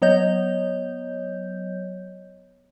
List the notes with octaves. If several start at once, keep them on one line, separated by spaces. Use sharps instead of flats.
F#3 B3 C#5 D#5 G6